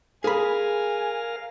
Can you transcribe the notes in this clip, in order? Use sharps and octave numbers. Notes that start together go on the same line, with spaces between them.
G#4 A#4 F5 G#5 B5